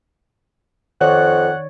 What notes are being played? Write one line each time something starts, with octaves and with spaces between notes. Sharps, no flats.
F2 D#3 C#5 D5 F#5